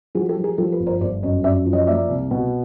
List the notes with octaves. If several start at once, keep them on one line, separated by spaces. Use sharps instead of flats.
F3 F#4 G#4
G4 A4
F3
G#4 A#4
F3 G4 A4
A4 B4
G1
A#4 C5
G1 C5 D5
F#2 C#5 D#5
F#2 D5 E5
F3
C#5 D#5
A#3 D5 E5
C2
B2